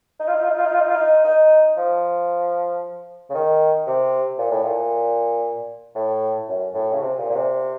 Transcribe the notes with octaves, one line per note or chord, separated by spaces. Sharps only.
D#4
F4
D#4
F4
D#4
F4
D#4
F4
D#4
F4
D#4
D#4
F3
C#3
D#3
C3
A#2
A2
A#2
A2
F#2
A2
C#3
C3
A#2
A#2
C3